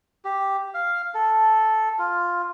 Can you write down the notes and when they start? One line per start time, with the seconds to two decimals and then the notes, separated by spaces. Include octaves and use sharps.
0.25 G4
0.74 F5
1.14 A4
1.99 F4